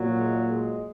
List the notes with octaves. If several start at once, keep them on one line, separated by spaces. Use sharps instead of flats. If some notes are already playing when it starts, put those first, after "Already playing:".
Already playing: A#2 F#3
G#3
G#3